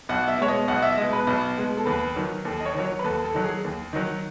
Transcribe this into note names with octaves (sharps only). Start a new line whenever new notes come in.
B1 F#5
E5
B2 G#3 C#5
D#5
B1 F#5
D#5
E5
B2 G#3 D#5
B4
B1
B2 G#3
A4
D#2 B4
D#3 F#3
D#2 A4
D#5
C#5
D#3 F#3
C#5
B4
D#2 A4
A4
D#3 F#3
G#4
D#2
D#3 F#3